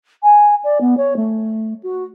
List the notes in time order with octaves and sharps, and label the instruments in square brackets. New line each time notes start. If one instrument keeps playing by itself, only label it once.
[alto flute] G#5
D5
B3
C#5
A3
F#4